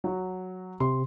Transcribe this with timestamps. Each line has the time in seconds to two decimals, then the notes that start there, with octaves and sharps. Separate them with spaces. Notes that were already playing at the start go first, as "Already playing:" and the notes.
0.04 F#3 F#4
0.80 C3 C6